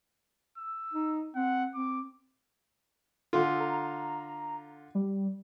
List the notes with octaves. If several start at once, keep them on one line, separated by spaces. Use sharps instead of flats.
E6
D#4
C4 F#5
C4 D6
D3 F4 A4
A#5
G3